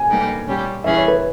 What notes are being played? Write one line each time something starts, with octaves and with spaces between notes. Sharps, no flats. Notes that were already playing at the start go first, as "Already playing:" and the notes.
Already playing: G#5
G3 A#3 D#4 G4 B4
A#2 G3 C#4 G4
E3 G3 C#4 G#4 B4 E5
C#5
B4